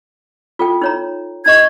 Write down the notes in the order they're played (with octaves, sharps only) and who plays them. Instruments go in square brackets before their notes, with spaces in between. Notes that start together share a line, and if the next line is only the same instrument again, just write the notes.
[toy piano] F4 A4 G5
D#4 C#5 A#5
[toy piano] D#4 D#5 C#6 [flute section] G#6